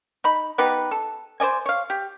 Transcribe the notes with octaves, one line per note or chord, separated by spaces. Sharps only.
D#4 B5
B3 D#4 G4 B4
A4
C5 D5 D#5 G#5
C#5 F5
G4